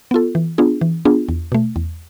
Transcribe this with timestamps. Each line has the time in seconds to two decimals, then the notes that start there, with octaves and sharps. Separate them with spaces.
0.11 B3 F4 A4
0.35 E3
0.58 B3 D4 F4 G#4
0.81 E3
1.05 B3 D4 F4 G#4
1.29 E2
1.52 B2 A3
1.76 E2